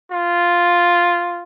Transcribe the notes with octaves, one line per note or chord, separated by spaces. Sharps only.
F4